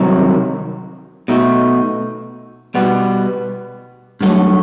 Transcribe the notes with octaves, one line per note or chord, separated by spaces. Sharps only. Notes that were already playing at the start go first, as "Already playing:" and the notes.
Already playing: C2 C3 D#3 F#3
B2 A3 D#4
B2 G3 B3
G2 F#3 A3